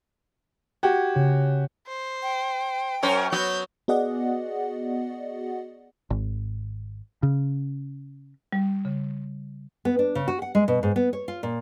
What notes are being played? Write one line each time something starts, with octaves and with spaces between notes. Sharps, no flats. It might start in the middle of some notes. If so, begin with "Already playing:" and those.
F#4 G4 G#6
C#3
C5
G5
F#2 C#4 A#4 C5
F#3 B3 F#4 G6
B3 F#4 G#4 D5 D#5 F#5
G#1
C#3
G3
C#3
B3
D4
C#3
F#4
F#5
G#3
B2
G#2
B3
C#5
F4
A#2